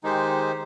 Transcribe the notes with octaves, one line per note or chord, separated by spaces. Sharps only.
D#3 G#3 D#4 G4 C5